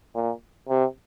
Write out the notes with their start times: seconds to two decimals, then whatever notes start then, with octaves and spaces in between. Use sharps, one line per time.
0.15 A#2
0.69 C3